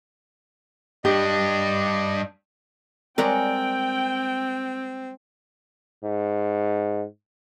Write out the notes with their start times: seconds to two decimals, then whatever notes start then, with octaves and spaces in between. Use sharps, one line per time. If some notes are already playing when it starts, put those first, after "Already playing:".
1.05 G2 D4 G4 D#5
3.18 G3 G#3 C4 A#4 C#5 D5 F#5 G5
6.04 G#2